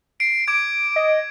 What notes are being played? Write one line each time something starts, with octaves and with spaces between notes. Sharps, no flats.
C7 D7
D6 G#6 D7
D#5